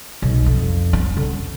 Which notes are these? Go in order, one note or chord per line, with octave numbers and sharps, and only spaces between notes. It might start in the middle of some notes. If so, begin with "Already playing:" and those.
B1
F2
C#4
D3